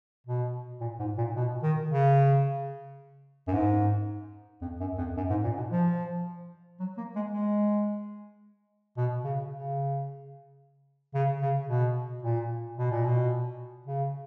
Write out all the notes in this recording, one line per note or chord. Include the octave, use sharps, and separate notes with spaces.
B2
A#2
G#2
A#2
B2
D#3
C#3
F#2
G#2
F2
F#2
F2
F#2
G#2
A#2
B2
F3
F#3
A#3
G#3
G#3
B2
C#3
C#3
C#3
C#3
B2
A#2
B2
A#2
B2
C#3